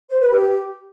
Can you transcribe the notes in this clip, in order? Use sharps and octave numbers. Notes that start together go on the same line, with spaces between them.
C5
B4
G4